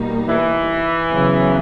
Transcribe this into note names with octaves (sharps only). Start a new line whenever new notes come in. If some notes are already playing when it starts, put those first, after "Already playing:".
Already playing: B2 G3 A#3 D#4
E3
C#3 F#3 B3